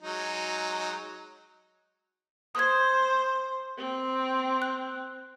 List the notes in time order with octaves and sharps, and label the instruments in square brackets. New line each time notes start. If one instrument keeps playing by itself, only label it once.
[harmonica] F#3 G#3 D#4
[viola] C5 [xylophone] D#6 G#6
[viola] C4
[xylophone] F#6